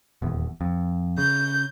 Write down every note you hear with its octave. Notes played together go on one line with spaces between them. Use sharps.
D#1 E2
F2
C#3 G6